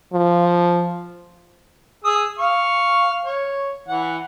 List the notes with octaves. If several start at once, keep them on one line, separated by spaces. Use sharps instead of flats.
F3
G#4 D#6 E6
F5 C#6
C#5
E3 F#5